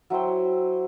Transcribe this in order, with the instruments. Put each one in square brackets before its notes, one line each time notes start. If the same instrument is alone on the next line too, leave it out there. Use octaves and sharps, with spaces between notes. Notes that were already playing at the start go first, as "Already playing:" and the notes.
[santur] F#3 E4 C5 G5